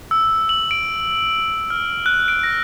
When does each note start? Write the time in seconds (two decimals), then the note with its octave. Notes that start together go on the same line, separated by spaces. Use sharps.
0.11 E6
0.49 F#7
0.71 D7
1.70 F6
2.06 F#6
2.28 D7
2.43 A#6